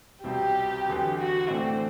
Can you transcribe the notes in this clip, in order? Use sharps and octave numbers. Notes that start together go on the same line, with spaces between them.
C2 B2 G3 C4 G4
E2 D3 F#3 B3
F#4
A2 E3 A3 C4 D4